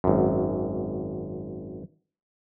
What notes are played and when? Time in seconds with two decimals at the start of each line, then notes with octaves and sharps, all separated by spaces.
0.04 G#1 F#2